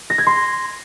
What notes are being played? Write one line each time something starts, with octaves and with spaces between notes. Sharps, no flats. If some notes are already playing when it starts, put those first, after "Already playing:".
A#6
G#6
C6